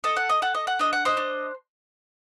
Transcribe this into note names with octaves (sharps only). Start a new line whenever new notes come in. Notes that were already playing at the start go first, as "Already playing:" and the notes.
A4 D#5
F#5
D#5
A4 F#5
D#5
F#5
D4 D#5
F#5
C5 D#5
D4